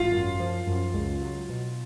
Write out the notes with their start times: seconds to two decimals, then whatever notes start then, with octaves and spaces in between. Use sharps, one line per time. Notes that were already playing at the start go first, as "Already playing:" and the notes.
Already playing: G#1 F4
0.12 F#2
0.40 F3
0.67 F#2
0.94 C#2
1.21 F#3
1.49 B2